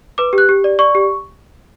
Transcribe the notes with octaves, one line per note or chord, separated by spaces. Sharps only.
B4 D6
G4
F#6
G4
D5
D5 C#6
G4